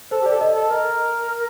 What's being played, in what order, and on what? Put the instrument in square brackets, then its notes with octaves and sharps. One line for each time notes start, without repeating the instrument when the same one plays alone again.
[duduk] A4 [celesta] C5
[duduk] G4
[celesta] D5
[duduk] A4
[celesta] D#5
[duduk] A4
[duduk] A#4 [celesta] D#5